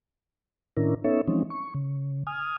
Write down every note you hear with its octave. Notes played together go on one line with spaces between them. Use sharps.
A2 D#3 C#4 D4 E4 A#4
B3 C#4 D#4 A4 C#5 E5
E3 F3 G#3 C4 C#4 D#4
C#6
C#3
G#5 D#6 F6